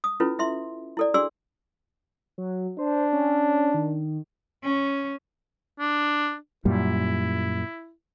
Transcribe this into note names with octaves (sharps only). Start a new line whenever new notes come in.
D#6
C#4 E4 F4 A4 B4
E4 E5 C6
E4 A4 D5
D4 F#4 G#4 D5 C6 E6
F#3
D4 C5
C#4
D#3
C#4
D4
F#2 A#2 G3 E4